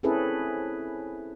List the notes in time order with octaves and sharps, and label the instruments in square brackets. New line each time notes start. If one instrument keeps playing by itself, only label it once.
[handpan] C4 C#4 E4 G#4 A4 B4